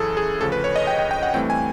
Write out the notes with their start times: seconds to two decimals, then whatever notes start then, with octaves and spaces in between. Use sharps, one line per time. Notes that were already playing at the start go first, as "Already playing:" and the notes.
Already playing: F#2 C#3 E3 G#4 A4
0.17 G#4
0.40 D2 C#3 F3 A4
0.52 B4
0.64 C#5
0.76 D#5
0.87 G5
0.99 G5
1.11 G5
1.23 F#5
1.34 G2 E3 A3 C4 G5
1.50 G#5